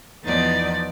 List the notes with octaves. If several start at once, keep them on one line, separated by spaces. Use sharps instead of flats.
E2 F3 B3 D#4 D5 A6